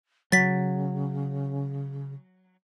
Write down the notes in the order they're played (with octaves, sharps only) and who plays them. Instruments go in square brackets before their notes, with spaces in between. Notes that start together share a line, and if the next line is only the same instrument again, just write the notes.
[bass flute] C#3 [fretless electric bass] F#3 [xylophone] A6 B6